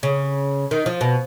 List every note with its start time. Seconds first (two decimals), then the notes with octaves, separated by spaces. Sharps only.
0.03 C#3
0.71 D#3
0.86 F3
1.01 B2